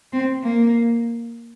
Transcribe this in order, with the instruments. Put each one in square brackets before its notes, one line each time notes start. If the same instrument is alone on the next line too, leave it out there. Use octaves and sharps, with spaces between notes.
[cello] C4
A#3